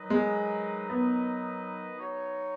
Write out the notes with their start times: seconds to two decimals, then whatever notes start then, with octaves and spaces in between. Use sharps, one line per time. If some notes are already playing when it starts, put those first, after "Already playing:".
Already playing: D#3 F#3 D#4 B4 D#5
0.10 G#3
0.90 B3
1.96 F#3 D#4 F#4 C#5